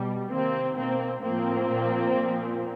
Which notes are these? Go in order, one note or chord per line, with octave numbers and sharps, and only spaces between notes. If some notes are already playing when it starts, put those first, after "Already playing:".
Already playing: B2 G3
C3 D#3 A#3 C4
B2 A#3 C4
A2 F3 A#3 C4
A#2 F3
A#2 F3